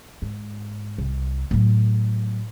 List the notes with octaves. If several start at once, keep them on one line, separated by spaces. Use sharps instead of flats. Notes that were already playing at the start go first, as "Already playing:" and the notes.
G#2
C2
A2 F#3